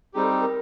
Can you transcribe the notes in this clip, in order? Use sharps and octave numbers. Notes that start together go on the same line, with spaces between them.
G3 C4 D#4 G4 G#4
A4
A#4